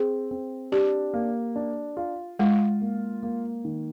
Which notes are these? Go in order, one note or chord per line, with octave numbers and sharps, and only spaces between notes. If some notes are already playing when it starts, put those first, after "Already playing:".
Already playing: C4 G#4
C4
D4 G4
A#3
D4
F4
G#3 F4
A#3
A#3
D#3